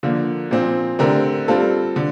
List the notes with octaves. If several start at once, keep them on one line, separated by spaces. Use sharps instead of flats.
D3 F3 A#3
A#2 F3 C4
D3 A3 C4 G4 A#4
G3 C4 F4 A4
D3